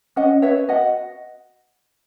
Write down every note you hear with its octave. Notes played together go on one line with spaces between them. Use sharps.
C#4 D#5 F#5
B4 C#5 E5
F#4 D#5 F#5